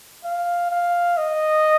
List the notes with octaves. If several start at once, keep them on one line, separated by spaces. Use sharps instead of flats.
F5
F5
D#5